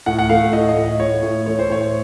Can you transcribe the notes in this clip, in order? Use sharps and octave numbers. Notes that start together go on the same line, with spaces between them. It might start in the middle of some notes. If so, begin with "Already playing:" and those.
A2 F#5
F#5
A3 F5
A2 D#5
D#5
A2
D#5
A2 C#5
A2
A3 C#5
C5
A2 C#5